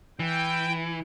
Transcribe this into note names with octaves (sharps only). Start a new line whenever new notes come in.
E3 G5